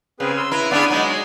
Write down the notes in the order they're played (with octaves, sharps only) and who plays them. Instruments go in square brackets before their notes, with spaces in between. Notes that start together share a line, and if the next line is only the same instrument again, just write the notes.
[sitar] C#3 [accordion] C4 G#4 B4
[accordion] C6 E6
[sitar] E4 [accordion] B4 A#5
[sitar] B3 D4 G#4 [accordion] D5 F5 D6
[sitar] F#3 G#3 [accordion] D#4
[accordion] C#5